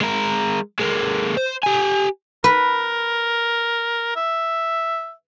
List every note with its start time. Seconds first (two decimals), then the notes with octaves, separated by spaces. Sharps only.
0.01 G#3 A#4
0.80 G#3 A#3
1.37 C5
1.63 G4 G#5
2.44 A#4 B4
4.16 E5